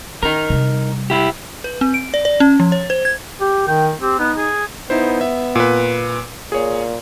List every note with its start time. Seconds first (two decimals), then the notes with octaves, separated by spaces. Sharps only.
0.23 C#4 D#4 A#4
0.50 C3 G3
1.10 E4 G4
1.64 B4
1.81 C4
1.94 D7
2.14 D5
2.25 D5
2.40 C#4
2.60 F3
2.72 C#5
2.90 C5
3.05 G#6
3.41 G4
3.68 D#3 G5
4.02 C4 G4
4.19 B3 D#4
4.38 G#4
4.90 B3 D#4 E4 C5
5.21 E5
5.55 A#2 B4
6.52 A#2 G#4 C#5